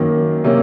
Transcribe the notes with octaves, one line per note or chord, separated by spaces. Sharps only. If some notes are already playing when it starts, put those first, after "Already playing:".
Already playing: F#2 D#3 A#3
C3 F#3 A#3 C#4